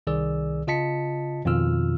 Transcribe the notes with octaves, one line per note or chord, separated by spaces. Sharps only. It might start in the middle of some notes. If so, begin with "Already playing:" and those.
C2 D#3 G#4 D5 E6
C#3 F4 D#5 A5 B6 C#7
F2 B2 D#3 F4 E6 F6